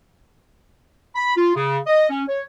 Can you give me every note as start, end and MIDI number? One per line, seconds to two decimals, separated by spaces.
1.16 1.33 83
1.36 1.55 65
1.55 1.78 49
1.87 2.09 75
2.10 2.23 61
2.28 2.41 73